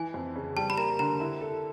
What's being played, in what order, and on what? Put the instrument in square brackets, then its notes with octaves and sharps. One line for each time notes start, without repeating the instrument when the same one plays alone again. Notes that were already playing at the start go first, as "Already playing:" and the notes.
Already playing: [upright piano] E3 [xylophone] G#5
[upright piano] F2
C#3
[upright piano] G3 [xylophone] A5
[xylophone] B5
[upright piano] A#3 [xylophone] A#5
[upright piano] D3 [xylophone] A#5
[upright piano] E4
A4